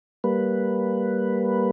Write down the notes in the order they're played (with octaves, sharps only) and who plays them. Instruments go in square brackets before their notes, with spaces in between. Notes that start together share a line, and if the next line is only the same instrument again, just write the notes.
[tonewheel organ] G3 A#3 B4